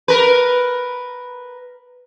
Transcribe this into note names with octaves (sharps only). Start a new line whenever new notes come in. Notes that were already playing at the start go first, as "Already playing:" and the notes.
A#4 B4